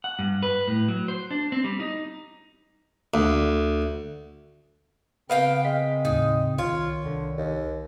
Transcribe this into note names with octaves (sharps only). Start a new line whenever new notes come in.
F#5
G2
B4
A2
F#3
C5
D4
C4
G3
D#4
D2
C#3 B3 C4 A#4 F5 G5
G#3 B6
D#2 A2 D#4
C2 D#3 F4 C#5
C2 D3
D#2